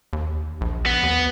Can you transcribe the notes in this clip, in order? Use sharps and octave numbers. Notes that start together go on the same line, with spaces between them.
D#2
A#1
B3
D#2